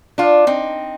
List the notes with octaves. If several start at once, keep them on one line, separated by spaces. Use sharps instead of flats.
D4 F4
C4 D#4